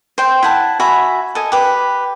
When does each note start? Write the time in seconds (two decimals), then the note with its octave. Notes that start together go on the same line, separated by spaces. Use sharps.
0.18 C5 G5
0.43 E4 F#5 A5
0.80 F#4 E5 G#5 B5
1.35 A4 D#5 G#5
1.52 G4 B4